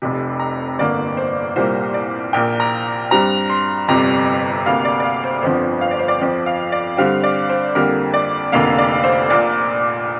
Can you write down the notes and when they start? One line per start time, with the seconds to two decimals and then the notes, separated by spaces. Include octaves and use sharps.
0.02 F1 F2 C3
0.40 A#5
0.79 G1 F2 D3 A#3 D5
1.17 C5
1.56 C2 A#2 G3 A#3 C5
1.94 D5
2.33 A#1 A#2 A#3 G5
2.60 A#5
3.11 G2 G3 C4 A#5
3.50 C6
3.88 G1 F2 C3 G3 A#5
4.66 D2 C3 A#3 F5
4.85 D5
5.00 D5
5.04 F5
5.24 C5
5.42 G1 F2 D3 F3 C4 C5
5.81 F5
5.91 D5
5.99 C5
6.08 D5
6.21 F2 F3 C4 D5
6.46 F5
6.72 D5
6.97 G2 D3 G3 C4 F5
7.23 D5
7.49 C5
7.75 F2 D3 G3 A#3 A#4
8.14 D5
8.52 F1 F2 D3 A#3 F5
8.78 D5
9.04 C5
9.30 A#1 A#2 A#3 D5